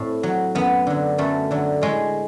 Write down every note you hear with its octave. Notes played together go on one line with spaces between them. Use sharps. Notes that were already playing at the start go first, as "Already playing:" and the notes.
Already playing: A2 C4
F#3
F#2 B3
D3 F#3
F#2 A3
D3 F#3
A2 G#3